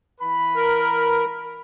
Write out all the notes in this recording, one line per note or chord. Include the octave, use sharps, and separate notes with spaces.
E3 B4 B5
A#4